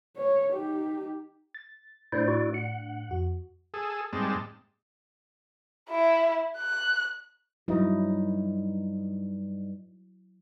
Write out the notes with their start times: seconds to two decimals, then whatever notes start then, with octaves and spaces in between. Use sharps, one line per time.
0.17 C#5
0.53 D#4 G4
1.55 A6
2.12 A2 A3 D4 E4 C5 D5
2.28 E4 F#4 D5
2.54 F#5
3.09 F2 F#4
3.74 G#4 A4
4.13 G#2 G3 G#3 C4 A5
5.90 E4
6.57 F#6
7.68 G2 F#3 D#4 E4